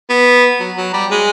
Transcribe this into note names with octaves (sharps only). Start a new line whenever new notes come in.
B3
F#3
F#3
G3
G#3